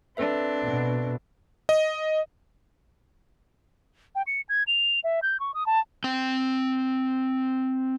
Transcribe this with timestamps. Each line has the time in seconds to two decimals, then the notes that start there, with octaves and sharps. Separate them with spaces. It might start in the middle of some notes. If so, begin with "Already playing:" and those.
0.17 C4 D4 A4 B4 E5
0.66 B2
1.69 D#5
4.15 G5
4.27 C#7
4.49 G#6
4.67 F7
5.04 E5
5.22 G6
5.40 C#6
5.54 D#6
5.66 A5
6.04 C4 G5